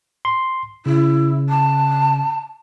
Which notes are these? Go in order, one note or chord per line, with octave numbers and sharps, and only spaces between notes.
C6
C#3 E4
A5